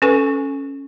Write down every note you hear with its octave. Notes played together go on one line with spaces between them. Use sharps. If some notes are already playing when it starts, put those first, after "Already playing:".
C#4 A4 B4 G#5 C#6